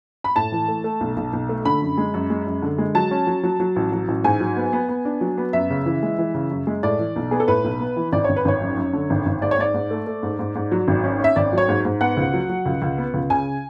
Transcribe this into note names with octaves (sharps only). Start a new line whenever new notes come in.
B5
A2 A5
E3
A3
A3
B1
B1
B1
A3
D3 B5
F#2
G#3
F#2
G#3
F#2
D3
G#3
F#3 A5
C#4
F#3
F#3
F#3
A1
F#3
A1
G#2 G#5
F#3
B3
B3
B3
D4
F#3
B3
F#2 E5
C#3
E3
G#3
E3
C#3
F#2
G#3
A2 D5
E3
B1
B3 G#4
A4
A2 B4
B1
B3
E3
G#1 D5
G#1 C#5
B4
G#1 C#5
F#2
F#2
D3
G#1
G#1
G#2 D5
C#5
G#2 D5
G#2
A3
A3
G#2
G#2
G#2
F#3
G#1
C#4
C#4 E5
G#1 D5
F#3 C#5
G#2
G#2
B3 F#5
C#2
F#3
F#3
C#2
C#2
B3
C#2
C#3 G#5